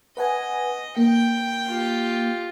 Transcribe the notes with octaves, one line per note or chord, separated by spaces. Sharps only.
B4 D#5 F#5 G#5
A#3 G5
F4 G4